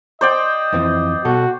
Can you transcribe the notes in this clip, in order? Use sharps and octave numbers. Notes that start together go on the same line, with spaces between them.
C5 D5 D#5 G5
F2 E3 C4
B2 F#4 A4